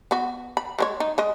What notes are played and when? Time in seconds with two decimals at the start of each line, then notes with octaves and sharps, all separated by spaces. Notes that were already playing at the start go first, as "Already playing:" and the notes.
0.11 B3 F#4
0.57 B5
0.79 G#3 C5 C#5
1.00 D#4
1.18 G#3 D#5